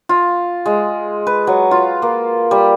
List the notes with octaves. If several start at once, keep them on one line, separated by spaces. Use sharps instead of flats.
F4
G#3
B4
F#3
F4
A#3
G3